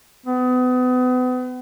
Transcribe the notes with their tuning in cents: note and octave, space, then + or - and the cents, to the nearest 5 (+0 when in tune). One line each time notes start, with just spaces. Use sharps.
B3 +35